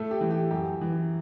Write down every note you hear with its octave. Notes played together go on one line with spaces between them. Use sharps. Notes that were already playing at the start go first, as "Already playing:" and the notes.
Already playing: A2 A3 A4
G4
E3
G4
F#2 G4
E3